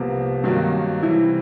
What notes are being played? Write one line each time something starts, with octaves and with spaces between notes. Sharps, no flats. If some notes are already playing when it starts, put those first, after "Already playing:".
Already playing: C2 C3 F3 A#3 B3
G2 D#3 F#3 A#3 C4
C3 E3 G3 E4